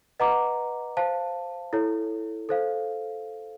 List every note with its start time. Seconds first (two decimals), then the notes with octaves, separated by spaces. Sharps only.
0.20 B4 D#5 F#5 A#5 D6
0.97 C5 F5 A5
1.73 E4 A4 C#5
2.49 A4 C5 F5